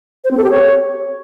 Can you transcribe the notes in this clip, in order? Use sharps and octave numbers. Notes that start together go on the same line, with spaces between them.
C5
C4
A4
G4
C#5